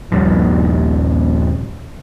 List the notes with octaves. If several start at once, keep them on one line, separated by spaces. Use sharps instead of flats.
A#1 D#2 F3 G3